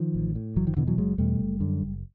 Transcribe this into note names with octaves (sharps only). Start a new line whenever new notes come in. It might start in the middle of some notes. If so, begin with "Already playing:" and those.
Already playing: D#3 F3
A1
A2
F#1 E3 F#3
D#3 F3
E2 B2 D3 E3
E3 F#3
F#1 F#3 G#3
E2 B2 G3 A3
F#1
F#2 D3
F#1